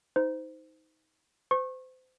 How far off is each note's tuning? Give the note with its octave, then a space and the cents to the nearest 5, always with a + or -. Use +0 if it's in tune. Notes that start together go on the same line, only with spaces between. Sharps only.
D#4 +25 C5 -20
C5 -30 C#6 -30